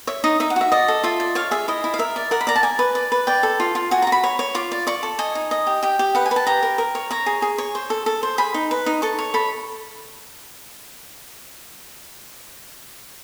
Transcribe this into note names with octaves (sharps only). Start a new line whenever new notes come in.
C#5 E5
D#4 D#5
D#4 E5
F#5
F#4 E5
D5 D#5
A4
F4 E5
D5
C#5 F5
G#4 E5
E4 D#5
E4
F5
A#4 E5
D5
A#4 F#5
B5
D5 A#5
A5
D5 G#5
B4
D5
B4
D5 G5
A4
F4
F4
F#4 G#5
A#5
F#4
B5
C#5
C#5
F4 D6
D5
D5 C#6
A4
D#5 G#5
D#4
D#5
G4
G4 G5
G4
B4 F#5
G#5
B4
A5
G4 A#5
A#4
A#4
C#5
C#5 A#5
G#4
G#4
C#5
C5
A4
A4
C5
G#4 B5
D#4
B4
D#4
A4 C#6
C#5
A4 B5